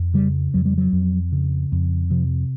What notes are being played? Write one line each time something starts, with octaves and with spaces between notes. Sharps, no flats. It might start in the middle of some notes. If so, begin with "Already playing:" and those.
Already playing: F2
C#3 G3
F2 F#3
G3
F#3
F2
C#3
F2
C3 F3